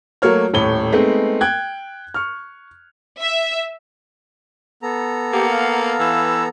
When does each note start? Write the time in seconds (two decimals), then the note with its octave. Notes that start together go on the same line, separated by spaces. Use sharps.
0.22 F#3 A3 A#3 C#5 F6
0.54 D#1 A2 C#5 G7
0.92 G#3 A3 B3 C4 D#4
1.41 G5 F#6 G#6
2.14 C#6 F6
3.19 E5
4.83 B3 A4 A#5
5.33 A#3 G4 F#5
5.52 F5
6.00 E3 E6